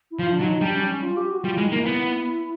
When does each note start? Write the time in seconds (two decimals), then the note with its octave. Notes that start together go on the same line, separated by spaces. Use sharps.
0.11 E4
0.19 F3 F4
0.32 D4
0.40 F#3 D#4
0.61 G3 D4
0.75 C#4
0.85 D4
0.89 C#4
1.03 F4
1.17 G4
1.31 F#4
1.44 G3 F4
1.56 G#3 E4
1.68 A#3 D#4
1.79 E4
1.86 B3